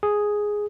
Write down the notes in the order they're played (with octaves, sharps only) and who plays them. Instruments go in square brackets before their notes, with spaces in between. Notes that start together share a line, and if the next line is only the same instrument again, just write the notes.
[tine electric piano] G#4